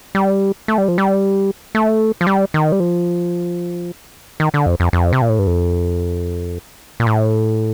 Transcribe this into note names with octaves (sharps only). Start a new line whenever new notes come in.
G3
A3
G3
F3
G3
A3
F3
G3
D#3
G3
F3
D#3
D3
F2
F2
F2
C3
A#2
A2
G2
F2
A#2
A2